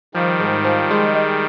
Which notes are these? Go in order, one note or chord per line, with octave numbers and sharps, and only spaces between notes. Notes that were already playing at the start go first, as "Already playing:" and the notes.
D#3 F3 G3
G#2
F3
G#3
G#3